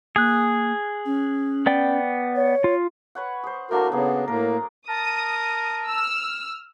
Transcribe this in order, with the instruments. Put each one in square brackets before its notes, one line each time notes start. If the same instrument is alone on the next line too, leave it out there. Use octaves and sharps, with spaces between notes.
[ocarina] A#3 [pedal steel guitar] G#4 F#6
[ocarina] C#4
[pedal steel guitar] B3 D5 G5
[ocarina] C#5
[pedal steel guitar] F4
[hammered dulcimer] B4 C#5 F#5
G#4 C5
[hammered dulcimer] A2 A#3 D4 [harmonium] F#4 A#4
[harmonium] C#3 B3 [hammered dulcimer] F#3 A#3 G#4
[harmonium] A2 A#3 [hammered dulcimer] A#4
[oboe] A#4 [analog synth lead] A5 [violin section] D#6
[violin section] E6 F6